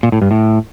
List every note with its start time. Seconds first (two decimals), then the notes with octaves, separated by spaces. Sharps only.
0.03 A#2
0.12 A2
0.22 G2
0.31 A2